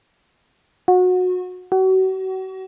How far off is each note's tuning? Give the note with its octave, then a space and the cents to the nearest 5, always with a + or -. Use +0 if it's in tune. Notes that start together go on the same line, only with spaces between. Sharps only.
F#4 -25
F#4 +35